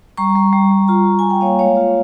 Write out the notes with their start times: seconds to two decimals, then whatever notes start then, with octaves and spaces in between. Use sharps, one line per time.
0.17 G3 A#5 C#6
0.36 G3
0.53 G3
0.71 G3
0.88 F4 A#5 C#6
1.06 G3
1.19 F4 G#5
1.31 G5
1.41 A#3 C#5 F5
1.59 G#3 C#5 F5
1.77 F4